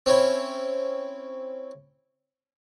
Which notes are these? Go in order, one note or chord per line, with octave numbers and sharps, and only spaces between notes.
C4 C#4 E4